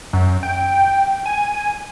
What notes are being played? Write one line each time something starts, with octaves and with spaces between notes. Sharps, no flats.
F#2
G5
G#5